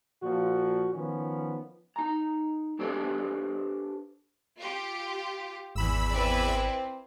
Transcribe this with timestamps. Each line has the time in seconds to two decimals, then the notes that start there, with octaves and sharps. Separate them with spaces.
0.22 A#2 F3 F4 F#4
0.94 D#3 F3 B3 C#4
1.96 D#4 A#5
2.79 D4 G4 A4 B4 C5 D5
4.59 F4 G4
5.76 G#1 E2 B5 E6
6.12 C4 E4 B4 D5